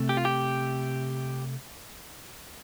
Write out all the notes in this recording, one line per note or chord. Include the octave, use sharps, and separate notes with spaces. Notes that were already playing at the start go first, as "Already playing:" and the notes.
Already playing: C3 A3
G4
F4
G4